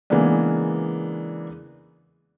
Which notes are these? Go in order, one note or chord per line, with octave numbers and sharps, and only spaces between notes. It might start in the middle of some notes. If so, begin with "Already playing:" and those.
C#3 E3 G#3 A#3 B3 D4